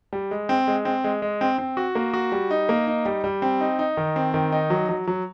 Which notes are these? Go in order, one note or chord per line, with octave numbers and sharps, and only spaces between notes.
G3
G#3
C4
G#3
C4
G#3
G#3
C4
C4
F#4
A#3
F#4
G3
D#4
A#3
D#4
G3
G3
C4
D#4
D#4
D#3
C4
D#3
D#4
F#3
F#3
F#3